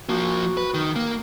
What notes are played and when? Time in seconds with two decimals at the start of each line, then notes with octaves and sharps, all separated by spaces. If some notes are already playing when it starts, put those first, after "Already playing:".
0.09 F3 A#3 F#4
0.57 B4
0.74 D#3
0.96 A#3